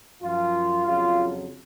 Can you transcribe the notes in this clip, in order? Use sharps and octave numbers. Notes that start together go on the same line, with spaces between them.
F#2 F3 F4
F2 C#3 F#3 F4